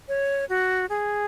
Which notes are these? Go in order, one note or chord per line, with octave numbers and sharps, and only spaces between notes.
C#5
F#4
G#4